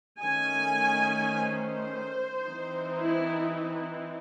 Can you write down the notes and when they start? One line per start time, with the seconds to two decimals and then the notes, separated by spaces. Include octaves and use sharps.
0.22 D#3 A3 C#4 G#5
1.33 C5
2.44 E3 C4 D#4
2.99 E4
3.55 E4